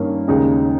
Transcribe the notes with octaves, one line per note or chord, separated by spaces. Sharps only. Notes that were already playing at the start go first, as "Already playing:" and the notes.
Already playing: G2 D#3 A#3 C#4
D#2 C#3 G#3 D#4